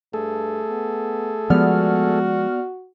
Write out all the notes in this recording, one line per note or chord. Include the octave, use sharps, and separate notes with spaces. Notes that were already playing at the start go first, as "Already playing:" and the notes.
G2 A3 G#4 A4
B3
F3 G#3 B3 F#4 D5 F6